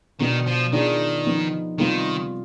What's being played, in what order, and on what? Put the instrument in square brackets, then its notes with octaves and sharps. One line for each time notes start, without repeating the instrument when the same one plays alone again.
[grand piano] B2 B3 D4 [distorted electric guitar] D#3
[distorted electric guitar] F3
[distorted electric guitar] D#3 [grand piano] B3 D4 F4 G#4
[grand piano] F3 B3 D#4
[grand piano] C3 G3 B3 F4 [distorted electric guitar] D#3